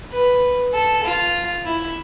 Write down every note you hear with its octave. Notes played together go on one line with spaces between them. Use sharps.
B4
A4
F4
E4